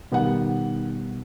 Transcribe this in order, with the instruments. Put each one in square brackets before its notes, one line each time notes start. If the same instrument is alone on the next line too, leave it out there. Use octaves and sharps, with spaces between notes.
[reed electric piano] B2 G3 B3 [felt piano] D#3 F#5